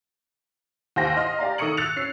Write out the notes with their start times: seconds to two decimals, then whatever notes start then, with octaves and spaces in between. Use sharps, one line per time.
0.96 D#2 G4 C5 F#5 G5 A#6
1.17 D#5 C6 F6
1.39 G4 D5 F5 A#5
1.58 D#3 A4 C#6 D#6 C#7 F#7
1.77 E6 F#6 A6 C#7 F7
1.96 C#4 C7